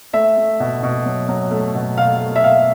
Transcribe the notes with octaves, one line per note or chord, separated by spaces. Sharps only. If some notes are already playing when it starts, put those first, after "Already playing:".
A3 E5
A3
B2
B2
F#3
F#3
A3
B2
B2 F5
A3
E5
B2 F5